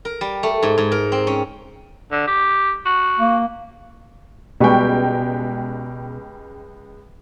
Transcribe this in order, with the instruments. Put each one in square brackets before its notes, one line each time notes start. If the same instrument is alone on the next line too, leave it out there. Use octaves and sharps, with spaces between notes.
[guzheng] A#4
G3
A3
G#2
G#2
A#4
C4
C#4
[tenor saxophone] D3
G4
F#4
[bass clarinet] A#3
[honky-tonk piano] C#2 G#3 G5 [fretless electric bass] B2 [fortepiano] G3 B4 C#6